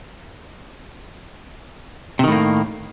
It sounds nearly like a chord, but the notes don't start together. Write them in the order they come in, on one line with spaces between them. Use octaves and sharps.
C3 D#3 A2 A#3